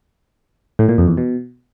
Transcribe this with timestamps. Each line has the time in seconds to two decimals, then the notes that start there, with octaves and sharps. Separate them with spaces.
0.79 A2
0.89 A#2
0.98 F2
1.08 E2
1.17 B2